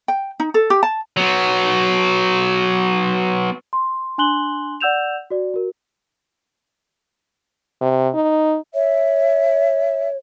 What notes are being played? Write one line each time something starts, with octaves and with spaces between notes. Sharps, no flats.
G5
D#4
A4
G4
A5
F#3 B3
C6
D4 G#5 C6 F#6 F#7 G7
D5 F#5 E6 G6 E7 F7
F#4 D5
F#4 A#4
C3
D#4
C#5 E5